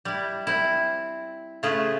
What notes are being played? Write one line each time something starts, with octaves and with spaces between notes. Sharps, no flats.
G3 E4
C4 E4
C#3 A3 F4 G#4 B4